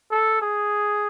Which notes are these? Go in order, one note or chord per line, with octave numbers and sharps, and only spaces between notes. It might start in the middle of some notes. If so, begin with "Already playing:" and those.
A4
G#4